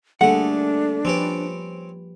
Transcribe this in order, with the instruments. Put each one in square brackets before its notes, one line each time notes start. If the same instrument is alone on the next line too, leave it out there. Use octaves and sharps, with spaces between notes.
[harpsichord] D3 A3 [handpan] G3 A#3 G#4 [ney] D4 [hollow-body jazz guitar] F#5
[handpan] F3 G4 B4 [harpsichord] C4 C#4 D5